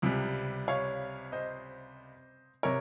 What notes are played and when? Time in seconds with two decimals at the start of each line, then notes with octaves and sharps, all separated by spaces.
0.02 C#2 C3 G3
0.68 C#5 F5
1.32 C5 D#5
2.63 C3 A#4 C#5